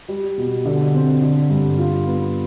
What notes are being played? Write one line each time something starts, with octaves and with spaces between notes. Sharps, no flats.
G3
B2
D3
C4
D3
G2
F4
B3